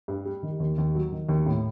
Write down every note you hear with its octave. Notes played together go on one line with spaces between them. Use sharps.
G2
G3
D#3
D#2
D#2
F#3
D#3
D#2
A2